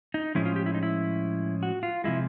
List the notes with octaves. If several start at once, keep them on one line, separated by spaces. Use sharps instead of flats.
D#4
A2 F3 G#3 C#4 E4
F4
G4
E4
D#4
E4
F#4
F4
C3 F3 G#3 E4